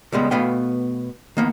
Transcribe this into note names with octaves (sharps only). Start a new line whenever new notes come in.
C#2 G3 G#3 B3
B2 A3 B3 B4 F5 G5
D#3 A#3 B3